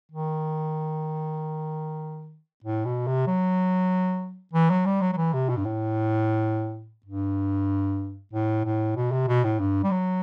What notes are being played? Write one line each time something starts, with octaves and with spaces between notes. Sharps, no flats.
D#3
A2
B2
C3
F#3
E3
F#3
G3
F#3
F#3
E3
C3
B2
G2
A2
G2
A2
A2
B2
C3
B2
A2
G2
G3
F#3